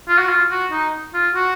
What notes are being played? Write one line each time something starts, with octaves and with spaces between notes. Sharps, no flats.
F4
F#4
F4
F#4
D#4
F4
F#4